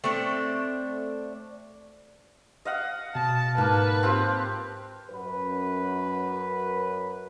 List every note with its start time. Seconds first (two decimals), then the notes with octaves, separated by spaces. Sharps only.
0.04 A3 C4 D4 A4
2.65 D#5 F5 F#5
3.15 B2 A5
3.58 G#2 A#3 B4 A5
4.03 C4 F4 G4
5.10 F#2 F#3 B4